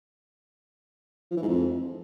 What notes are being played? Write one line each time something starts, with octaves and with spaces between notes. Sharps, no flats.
F3
E3
G#2
F2